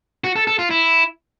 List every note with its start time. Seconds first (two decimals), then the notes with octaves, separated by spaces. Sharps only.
0.24 F#4
0.36 A4
0.47 A4
0.59 F4
0.70 E4